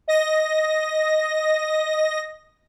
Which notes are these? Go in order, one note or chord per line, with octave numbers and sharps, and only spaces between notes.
D#5 A#6